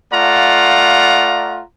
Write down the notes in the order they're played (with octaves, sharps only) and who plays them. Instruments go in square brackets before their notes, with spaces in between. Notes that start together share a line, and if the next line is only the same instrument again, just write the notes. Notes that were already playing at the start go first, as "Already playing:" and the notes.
[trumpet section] A3 F4 D5 F5 F#5 A#5